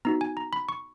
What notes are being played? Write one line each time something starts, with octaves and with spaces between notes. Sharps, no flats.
B3 D#4 F#4 A#5
G#5
A#5
B5
C#6